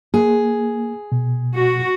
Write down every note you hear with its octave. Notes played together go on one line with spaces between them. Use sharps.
A#3 G#4
B2
F#4